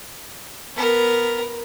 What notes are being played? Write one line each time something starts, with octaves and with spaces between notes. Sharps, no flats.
B3 A#4